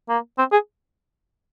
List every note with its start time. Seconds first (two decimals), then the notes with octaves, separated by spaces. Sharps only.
0.09 A#3
0.38 C4
0.52 G#4